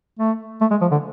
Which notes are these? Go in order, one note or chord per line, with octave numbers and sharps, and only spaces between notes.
A3
A3
G#3
F3
D3